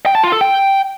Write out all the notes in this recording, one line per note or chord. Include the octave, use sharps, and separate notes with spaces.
G5
A5
F4
A4
G5